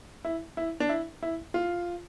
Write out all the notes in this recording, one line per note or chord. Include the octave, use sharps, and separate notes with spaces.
E4
E4
D4
E4
E4
F4